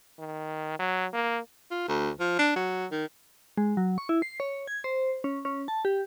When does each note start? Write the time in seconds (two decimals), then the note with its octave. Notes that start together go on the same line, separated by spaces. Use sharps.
0.19 D#3
0.79 F#3
1.13 A#3
1.71 F4
1.88 D2
2.20 F3
2.39 D4
2.56 F#3
2.91 D#3
3.58 G#3
3.77 F#3
3.98 C#6
4.09 E4
4.22 C7
4.40 C#5
4.67 G#6
4.84 C5
5.24 C#4
5.45 C#4
5.68 A5
5.85 G4